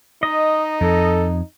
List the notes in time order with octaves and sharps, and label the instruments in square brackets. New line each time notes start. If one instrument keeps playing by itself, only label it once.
[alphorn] D#4 [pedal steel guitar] D#5
[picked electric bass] F2 [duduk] A4